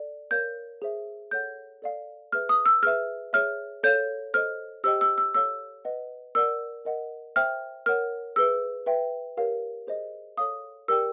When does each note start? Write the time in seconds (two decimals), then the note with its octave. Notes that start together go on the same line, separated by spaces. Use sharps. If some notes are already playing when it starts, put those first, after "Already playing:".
Already playing: A4 D5
0.31 A#4 C#5 F5 G6
0.82 G#4 C5 E5
1.31 A4 C#5 F#5 G6
1.82 A4 D5 F5
2.32 G#4 B4 E5 F6
2.49 D#6
2.66 E6
2.83 G#4 B4 E5 F6
3.33 G#4 C#5 E5 F6
3.83 A4 C#5 F5 G6
4.34 A4 C5 D#5 F6
4.84 G4 C5 D#5 G5 E6
5.01 E6
5.18 E6
5.35 A4 C#5 F5 E6
5.85 B4 D#5 F#5
6.35 A#4 D5 F#5 E6
6.85 A#4 D#5 F#5
7.36 C5 E5 G5 F6
7.86 A#4 C#5 F#5 F6
8.36 G#4 B4 E5 E6
8.86 B4 E5 G5
9.37 G4 A#4 C#5 F5
9.87 G#4 C5 D#5
10.38 A4 C#5 F5 D#6
10.88 G4 A#4 D5 G5 E6